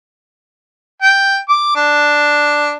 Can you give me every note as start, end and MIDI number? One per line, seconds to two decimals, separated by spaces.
1.02 1.38 79
1.49 1.73 86
1.76 2.76 62